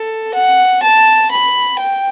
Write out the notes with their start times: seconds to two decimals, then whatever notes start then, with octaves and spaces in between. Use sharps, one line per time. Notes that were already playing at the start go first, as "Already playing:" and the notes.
Already playing: A4
0.34 F#5
0.83 A5
1.31 B5
1.79 G5